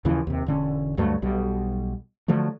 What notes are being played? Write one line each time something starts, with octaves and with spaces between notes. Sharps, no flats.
D#2 C#3 E3 F3
D#2 C3
E1 D3 C#4
D2 G2 F#3 A3
B1 B2 G3
D3 F3 F#3 A3